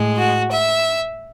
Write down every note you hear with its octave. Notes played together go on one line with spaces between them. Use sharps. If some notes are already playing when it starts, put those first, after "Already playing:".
Already playing: A2 G#3
F#4
E5